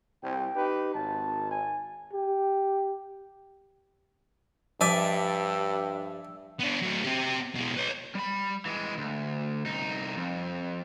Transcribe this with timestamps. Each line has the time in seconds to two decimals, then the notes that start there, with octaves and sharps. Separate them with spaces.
0.23 C2 G5
0.56 D#4 G4 B4
0.95 G#1 A5
1.51 G#5
2.13 G4
4.81 G2 F3 D5 E5 G#5
6.59 B3 D4
6.82 F#3 A3
7.04 C4 G4
7.55 B2 G#3
7.77 B4 C#5
8.15 G3 B5
8.66 E3 G#3
8.98 D2
9.65 C2 D#4
10.17 F2